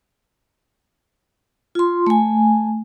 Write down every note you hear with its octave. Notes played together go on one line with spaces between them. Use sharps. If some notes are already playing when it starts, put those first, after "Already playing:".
F4 C6
A3 G#5